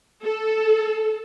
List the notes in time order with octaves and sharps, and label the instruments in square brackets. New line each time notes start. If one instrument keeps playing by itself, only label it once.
[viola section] A4